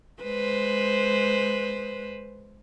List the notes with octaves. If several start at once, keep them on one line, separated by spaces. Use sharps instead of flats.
G#3 B4 C5